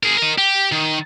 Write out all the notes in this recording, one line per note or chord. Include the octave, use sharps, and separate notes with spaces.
G#4 A#4
A#4 D#5
G4
D#3